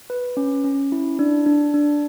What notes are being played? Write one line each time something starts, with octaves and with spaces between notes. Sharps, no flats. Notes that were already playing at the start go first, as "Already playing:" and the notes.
B4
C#4
C#4
E4
D4
D4
D4